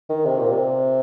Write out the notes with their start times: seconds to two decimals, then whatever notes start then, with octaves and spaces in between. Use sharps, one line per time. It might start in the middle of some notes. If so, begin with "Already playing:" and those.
0.10 D#3
0.26 C3
0.39 A#2
0.52 C3